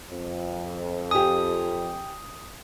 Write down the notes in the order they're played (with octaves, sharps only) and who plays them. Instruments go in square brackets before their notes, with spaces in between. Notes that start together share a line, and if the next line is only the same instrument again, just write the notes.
[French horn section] F2
[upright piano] G4 G#5 [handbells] D#6